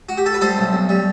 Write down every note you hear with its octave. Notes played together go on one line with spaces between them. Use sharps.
F#4
G4
A4
B4
G3 A4 C5
B1
B1
G3